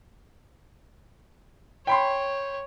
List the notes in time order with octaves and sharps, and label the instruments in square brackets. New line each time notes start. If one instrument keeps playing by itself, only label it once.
[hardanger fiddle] C#5 [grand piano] G5 B5 C6